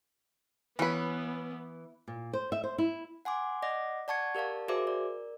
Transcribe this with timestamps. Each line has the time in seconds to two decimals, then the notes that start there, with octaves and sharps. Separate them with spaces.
0.79 E3 B3 C#4 B4
2.08 A#2
2.33 C5
2.52 E5
2.64 C5
2.78 E4
3.25 F#5 G#5 C6 D6
3.63 D5 D#5 F#5 D6 A#6
4.08 D5 F#5 A5 C#6 G#6 C#7
4.35 G4 A#4 D5 F5 A5
4.68 F#4 G#4 A#4 C5 E5 D6
4.87 A#4 D5